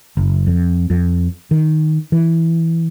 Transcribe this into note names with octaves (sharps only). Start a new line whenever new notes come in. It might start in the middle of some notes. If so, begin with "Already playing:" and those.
F#1
F2
F2
D#3
E3